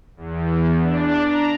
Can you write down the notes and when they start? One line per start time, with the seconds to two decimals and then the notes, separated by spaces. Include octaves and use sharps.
0.17 E2
0.82 D4
1.26 A#5